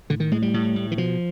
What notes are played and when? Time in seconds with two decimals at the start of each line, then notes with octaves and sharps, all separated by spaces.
0.10 A2 D3
0.20 D#3
0.31 A2 G#3
0.42 G3
0.54 A2
0.76 A2
0.91 E3
0.98 B2 F3